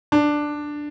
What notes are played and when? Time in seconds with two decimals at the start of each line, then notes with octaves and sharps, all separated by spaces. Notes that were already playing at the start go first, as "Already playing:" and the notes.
0.12 D4